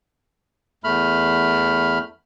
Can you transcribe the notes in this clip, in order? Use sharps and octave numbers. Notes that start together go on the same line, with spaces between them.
E2 A3 B5 F6